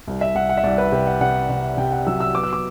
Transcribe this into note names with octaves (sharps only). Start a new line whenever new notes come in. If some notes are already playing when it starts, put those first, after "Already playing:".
C2
E5
C2 F#5
F#5
E5
C2 D5
B4
C3 G4
F#5
C3 F#5
C3 F#5
C3 G5
F#5
F#3 E6
E6
B3 D6
E6
D6